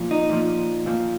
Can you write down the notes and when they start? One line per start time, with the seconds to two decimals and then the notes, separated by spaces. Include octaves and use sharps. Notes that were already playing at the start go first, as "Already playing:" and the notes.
Already playing: A#2 F3
0.11 D#4
0.29 A#2 F3
0.86 A#2 F3